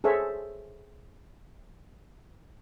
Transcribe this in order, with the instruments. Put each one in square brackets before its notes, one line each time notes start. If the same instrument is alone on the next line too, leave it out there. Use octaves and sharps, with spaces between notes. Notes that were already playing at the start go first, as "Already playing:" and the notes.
[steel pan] G#4 A4 C5 C#5 E5